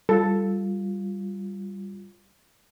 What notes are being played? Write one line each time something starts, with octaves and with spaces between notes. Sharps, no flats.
G3 F4 A4